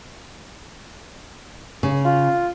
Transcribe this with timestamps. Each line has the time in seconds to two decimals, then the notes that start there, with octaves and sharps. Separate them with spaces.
1.83 C#3
2.05 F4